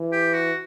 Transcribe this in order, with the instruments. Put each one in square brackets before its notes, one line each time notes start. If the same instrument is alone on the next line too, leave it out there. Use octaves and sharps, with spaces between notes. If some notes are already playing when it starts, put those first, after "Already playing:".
Already playing: [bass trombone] E3
[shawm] G4
F#4